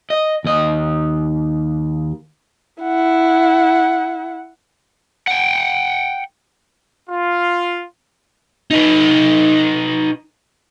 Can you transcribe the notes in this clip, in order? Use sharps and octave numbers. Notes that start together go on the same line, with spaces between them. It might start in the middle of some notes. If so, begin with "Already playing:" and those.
D#5
D#2 D#5
E4 F#5
F#5 G5
F4
D#4 B4